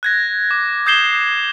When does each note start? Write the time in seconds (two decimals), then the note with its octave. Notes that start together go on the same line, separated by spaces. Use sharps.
0.03 F#6 G#6 A#6
0.51 D6
0.86 D#6 G6 G#6 C7 E7 G7